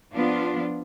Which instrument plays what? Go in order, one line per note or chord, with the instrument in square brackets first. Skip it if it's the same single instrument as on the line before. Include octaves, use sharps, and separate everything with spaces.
[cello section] F3 B3 D4 F4